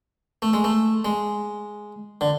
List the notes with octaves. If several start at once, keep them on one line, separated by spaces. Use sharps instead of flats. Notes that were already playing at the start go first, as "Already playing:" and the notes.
A3
G#3
A3
G#3
D3